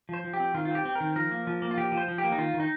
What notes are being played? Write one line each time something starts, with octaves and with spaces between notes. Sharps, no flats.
F3 C5
F3
G4
C4
D#3 F4
F4
C4 G4
C4
A#4
D#3
F3 A#4
A#3
F3
A#3
F4
F3 G4
F3
C5
F3
G4
A#3
D#4
D#3 F4
D#3
D#4